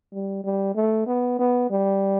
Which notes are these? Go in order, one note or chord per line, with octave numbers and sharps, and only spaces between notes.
G3
G3
A3
B3
B3
G3